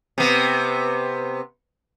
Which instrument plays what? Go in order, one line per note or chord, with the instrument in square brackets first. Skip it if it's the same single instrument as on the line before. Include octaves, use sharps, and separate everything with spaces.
[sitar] C3 B3